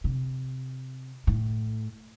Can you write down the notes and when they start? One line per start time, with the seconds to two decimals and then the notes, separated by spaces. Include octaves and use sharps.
0.04 C3
1.27 A2